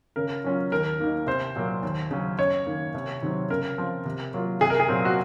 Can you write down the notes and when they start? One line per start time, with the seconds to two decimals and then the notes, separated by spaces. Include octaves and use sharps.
0.16 C#3 A#4
0.44 F#3 C#4 F4
0.72 D#2 A#4
1.00 D#3 A#3 D#4
1.27 C2 C5
1.56 A#2 F#3 A#3
1.83 D#2
2.11 C#3 F#3 C#4
2.38 F#2 C#5
2.66 D#3 A#3
2.94 C2
3.22 C3 D#3 F#3 C4
3.50 C#3 A#4
3.78 F3 C4 F4
4.05 C3
4.34 F#3 A#3 F4
4.61 C2 G#4
4.70 A#4
4.80 G#4
4.88 A#2 F#3 C4
5.05 F#4